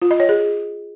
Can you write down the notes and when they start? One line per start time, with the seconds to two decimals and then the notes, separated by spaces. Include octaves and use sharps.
0.02 F4
0.11 D#5
0.20 C#5
0.29 G#4